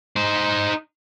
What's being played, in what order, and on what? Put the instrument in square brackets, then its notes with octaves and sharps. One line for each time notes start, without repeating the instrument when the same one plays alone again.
[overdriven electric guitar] D#4 C5